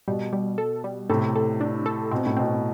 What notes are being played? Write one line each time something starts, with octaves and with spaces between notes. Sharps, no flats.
B2 G3
G3
A4
G3
A2 C3 A4
A4
D4
A4
B2 C4
A2
B2 C4